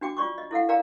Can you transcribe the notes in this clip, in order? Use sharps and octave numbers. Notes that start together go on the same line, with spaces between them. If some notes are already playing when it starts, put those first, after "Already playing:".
D4 F#4 G5 D6
F4 D5 C#6 D6
D#5
E4 A4 F5 F#5
A#4 D5 F5 G5 A#5